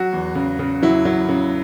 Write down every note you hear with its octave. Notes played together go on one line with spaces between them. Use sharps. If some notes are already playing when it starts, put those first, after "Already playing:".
Already playing: F#3 F#4
E2
C#3
C#3
F#3 E4
F#3
C#3